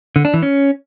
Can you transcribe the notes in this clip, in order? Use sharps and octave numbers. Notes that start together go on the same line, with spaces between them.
D3
D4
E3
C#4